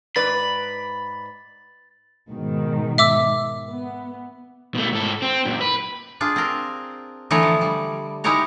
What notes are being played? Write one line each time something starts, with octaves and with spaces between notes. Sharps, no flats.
G#2 B4 D5 B5 A6
G#2 B2 D#3
E5 D6 E6
B3
B2 A3
G#2 A4
C4
F#2 A#2
B4
D4 F4 G#4
C4 A#4
D3 E3 F#3 A3 C#5 D#5
F3
G3
G#3 D#4 E4 G4 C#5 A#5